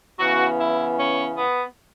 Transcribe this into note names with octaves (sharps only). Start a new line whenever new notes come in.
C#3 E3 B3 F#4
E4
C#4
B3